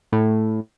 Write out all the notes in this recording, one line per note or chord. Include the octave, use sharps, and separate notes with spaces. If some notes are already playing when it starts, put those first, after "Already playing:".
A2